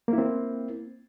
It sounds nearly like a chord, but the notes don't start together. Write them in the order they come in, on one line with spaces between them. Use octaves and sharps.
A#3 E4 C4